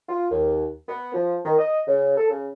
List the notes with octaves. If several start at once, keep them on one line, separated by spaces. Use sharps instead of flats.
F4
D#2
B3
F3
D#3
D#5
C#3
A4
C#3